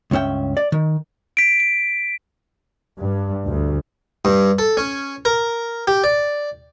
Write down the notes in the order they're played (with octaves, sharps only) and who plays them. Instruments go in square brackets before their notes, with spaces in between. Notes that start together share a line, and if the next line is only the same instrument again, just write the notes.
[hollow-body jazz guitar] C#2 G2 C#4 E5 G5
D5
D#3
[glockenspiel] B6 D7
D7
[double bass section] G2
D2
[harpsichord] G2
A4
C#4
A#4
G4
D5